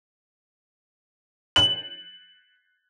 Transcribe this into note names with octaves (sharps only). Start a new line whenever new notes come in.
F#7